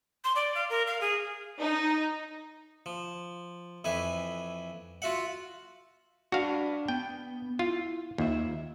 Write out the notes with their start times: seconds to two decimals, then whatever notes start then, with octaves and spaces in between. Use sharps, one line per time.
0.24 C6
0.36 D5
0.55 F5
0.70 A#4
0.87 F5
1.01 G#4
1.61 D#4
2.86 F3
3.84 F2 E3 B4 G#5
5.02 F4 F#4 E5 F#5
6.32 D4 F#4 B4 F5
6.88 B3 G5
7.59 E4 F4
8.18 D#2 F4 E5